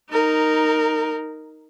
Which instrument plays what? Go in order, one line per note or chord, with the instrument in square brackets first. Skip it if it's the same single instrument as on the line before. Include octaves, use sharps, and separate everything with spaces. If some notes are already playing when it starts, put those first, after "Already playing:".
[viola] D#4 A#4